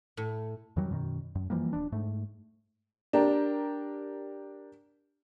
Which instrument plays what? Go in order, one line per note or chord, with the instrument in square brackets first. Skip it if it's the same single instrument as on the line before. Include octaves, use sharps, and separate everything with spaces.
[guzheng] A2
[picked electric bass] F2 D#3 F#3 G3
F#2 B2 D#3
F#2
E3 F3 G3 A#3
D#1 D4
G#2 A3
[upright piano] D4 G4 A#4